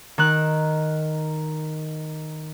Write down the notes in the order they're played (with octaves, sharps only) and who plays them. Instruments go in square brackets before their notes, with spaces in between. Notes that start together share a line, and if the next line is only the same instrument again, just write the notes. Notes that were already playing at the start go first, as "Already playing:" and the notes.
[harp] D#3 F#6